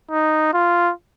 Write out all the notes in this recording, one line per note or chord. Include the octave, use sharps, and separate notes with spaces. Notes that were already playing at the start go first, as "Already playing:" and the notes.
D#4
F4